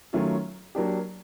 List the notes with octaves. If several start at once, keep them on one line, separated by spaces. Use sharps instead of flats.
D#3 F#3 A3 C#4 F4
F#3 A#3 D4 G4